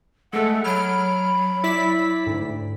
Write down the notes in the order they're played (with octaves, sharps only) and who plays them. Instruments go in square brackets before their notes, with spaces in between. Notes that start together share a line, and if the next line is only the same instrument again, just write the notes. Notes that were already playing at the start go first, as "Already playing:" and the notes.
[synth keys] G#3 A3 [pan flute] A4 [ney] F#5
[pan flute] F#3 [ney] B5 [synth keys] F6 D7
[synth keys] E4 D5 B6
[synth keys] D2 [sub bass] G#2